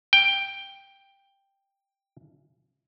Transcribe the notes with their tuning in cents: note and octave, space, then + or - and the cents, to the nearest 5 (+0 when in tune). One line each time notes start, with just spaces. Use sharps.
G5 +10